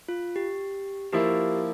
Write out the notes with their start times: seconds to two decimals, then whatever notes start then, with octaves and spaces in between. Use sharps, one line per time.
0.08 F4
0.36 G4
1.12 F3 A#3 E4 G4